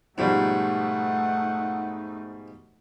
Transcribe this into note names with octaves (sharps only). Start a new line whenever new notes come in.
G#2 B2 F3 G3 A3 D#4 F#5